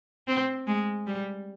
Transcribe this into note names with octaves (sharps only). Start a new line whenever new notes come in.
C4
G#3
G3